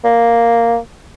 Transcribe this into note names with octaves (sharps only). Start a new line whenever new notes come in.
A#3